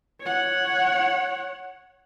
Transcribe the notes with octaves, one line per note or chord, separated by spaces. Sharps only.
C#5 F#5